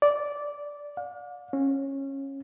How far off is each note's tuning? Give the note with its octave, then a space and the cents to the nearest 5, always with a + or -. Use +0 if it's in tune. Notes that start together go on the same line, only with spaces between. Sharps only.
D5 -10
F5 +45
C#4 -20